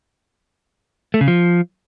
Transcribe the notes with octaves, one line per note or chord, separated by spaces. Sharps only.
A3
C#3
F3